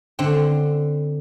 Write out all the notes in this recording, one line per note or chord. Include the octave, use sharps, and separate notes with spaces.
D3 C4